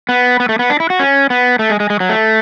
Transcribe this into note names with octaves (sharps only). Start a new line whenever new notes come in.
B3
B3
A3
B3
D4
E4
F#4
C#4
B3
A3
G#3
G#3
G#3
F#3
A3